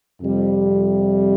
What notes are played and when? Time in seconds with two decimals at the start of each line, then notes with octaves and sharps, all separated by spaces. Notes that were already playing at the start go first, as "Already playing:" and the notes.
0.21 F2 C3 G3